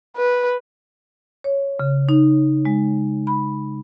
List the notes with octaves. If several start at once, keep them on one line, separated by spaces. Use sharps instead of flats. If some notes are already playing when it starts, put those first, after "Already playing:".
B4
C#5
C#3
D#4
G#3
B5